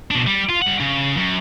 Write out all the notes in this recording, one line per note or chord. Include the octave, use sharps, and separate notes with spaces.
B2 D4
G3
F4
G3 F#5
C#3
F#2